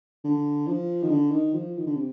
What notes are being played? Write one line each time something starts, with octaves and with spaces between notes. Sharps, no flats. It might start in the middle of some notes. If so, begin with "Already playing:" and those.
D3
F3
D#3
D3
D#3
F3
D#3
D3
C3